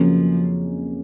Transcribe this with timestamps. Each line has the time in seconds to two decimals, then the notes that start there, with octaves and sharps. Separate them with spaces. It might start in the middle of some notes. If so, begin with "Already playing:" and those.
Already playing: F2 C#3 F3 F#3 A#3 C#4